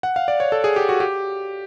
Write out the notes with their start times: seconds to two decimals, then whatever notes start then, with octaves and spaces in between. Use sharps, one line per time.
0.03 F#5
0.16 F5
0.28 D5
0.40 C#5
0.52 A4
0.64 G#4
0.76 G4
0.89 F#4
1.00 G4